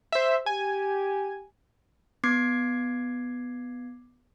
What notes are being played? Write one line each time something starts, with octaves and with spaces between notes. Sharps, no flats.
C5 E5
G4 G#5
B3 D6 G#6 C7